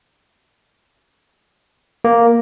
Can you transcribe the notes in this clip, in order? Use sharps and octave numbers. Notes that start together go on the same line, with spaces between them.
A#3